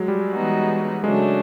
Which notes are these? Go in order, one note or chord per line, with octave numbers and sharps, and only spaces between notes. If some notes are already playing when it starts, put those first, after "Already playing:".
Already playing: F#3 G#3
G3
E3 G#3 B3 D#4 F#4
C#3 F#3 G#3 A3 D4